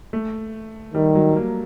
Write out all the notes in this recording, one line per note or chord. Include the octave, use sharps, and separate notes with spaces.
A3
D#3 G3
F#3
A#3